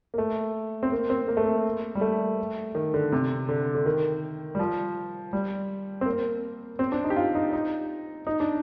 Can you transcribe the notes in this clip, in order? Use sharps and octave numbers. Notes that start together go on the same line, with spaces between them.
A#3
A3
C4
A#3
C4
A#3
A3
A#3
G3
A3
D#3
D3
C3
D3
D3
D#3
G3
F3
G3
C4
A#3
C4
D4
D#4
G4
F4
D#4
D#4
D#4
D4